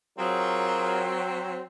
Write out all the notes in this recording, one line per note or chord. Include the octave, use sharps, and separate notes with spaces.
F#3 C4 F4 G#4 A#4